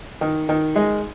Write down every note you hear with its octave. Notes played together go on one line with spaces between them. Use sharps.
D#3
D#3
G#3